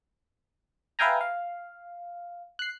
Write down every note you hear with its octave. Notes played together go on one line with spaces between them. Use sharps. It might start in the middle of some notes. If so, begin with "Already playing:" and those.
B4 E5 F5 G5 G#5 A#5
F5
F#6 C7